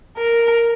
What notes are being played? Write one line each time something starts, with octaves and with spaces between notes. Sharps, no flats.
A#4